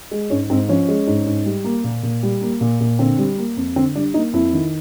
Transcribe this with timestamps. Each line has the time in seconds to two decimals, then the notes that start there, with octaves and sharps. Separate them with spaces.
0.11 G#3
0.30 G#2 C#4
0.50 G#2 C4
0.69 F3 C#4
0.88 G#3
1.07 G#2
1.26 G#2
1.45 G3
1.64 A#3
1.84 A#2
2.03 A#2
2.23 G3
2.42 A#3
2.61 A#2
2.80 A#2
2.99 D3 C4
3.18 G3
3.38 A#3
3.57 F2
3.76 D3 C4
3.95 G3 D4
4.14 A#3 D#4
4.33 F2 E4
4.53 D#3